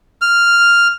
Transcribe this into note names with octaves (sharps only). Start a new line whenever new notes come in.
F6